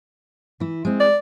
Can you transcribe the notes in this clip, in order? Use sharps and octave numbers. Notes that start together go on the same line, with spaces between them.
E3 E4
G#3 C4
D5